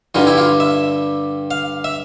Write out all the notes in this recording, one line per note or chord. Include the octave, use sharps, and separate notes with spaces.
G2 D3 G3 F4
E4
F4
E5
F5
E5